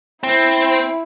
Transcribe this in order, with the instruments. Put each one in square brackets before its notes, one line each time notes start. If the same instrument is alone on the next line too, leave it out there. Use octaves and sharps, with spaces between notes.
[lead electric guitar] C4 [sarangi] E4